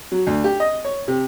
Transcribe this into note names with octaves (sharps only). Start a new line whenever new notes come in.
F#3
D2
G4
D#5
C#5
C3